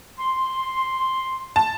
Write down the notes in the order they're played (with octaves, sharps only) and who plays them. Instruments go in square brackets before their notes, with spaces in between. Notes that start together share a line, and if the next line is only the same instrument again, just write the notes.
[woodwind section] C6
[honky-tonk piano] A5